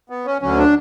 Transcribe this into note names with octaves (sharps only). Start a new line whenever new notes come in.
B3
C#4
D2 D3 F#3 C#4
D4